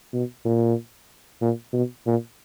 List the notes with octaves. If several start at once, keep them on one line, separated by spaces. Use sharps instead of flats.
B2
A#2
A#2
B2
A#2